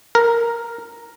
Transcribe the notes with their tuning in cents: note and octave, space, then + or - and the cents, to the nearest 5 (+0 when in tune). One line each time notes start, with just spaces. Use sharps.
A#4 +0